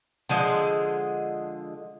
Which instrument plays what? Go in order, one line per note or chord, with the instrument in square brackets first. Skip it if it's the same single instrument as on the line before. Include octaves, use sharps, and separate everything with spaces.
[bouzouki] D3 F3 G#3 D#5